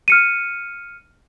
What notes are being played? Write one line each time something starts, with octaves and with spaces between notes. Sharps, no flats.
F6 C#7 D#7